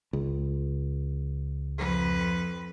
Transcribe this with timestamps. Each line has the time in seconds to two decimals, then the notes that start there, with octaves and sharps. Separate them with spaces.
0.13 C#2
1.78 F2 B4